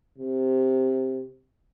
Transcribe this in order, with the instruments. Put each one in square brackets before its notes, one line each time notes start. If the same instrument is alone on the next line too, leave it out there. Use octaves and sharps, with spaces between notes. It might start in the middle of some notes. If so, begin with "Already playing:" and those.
[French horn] C3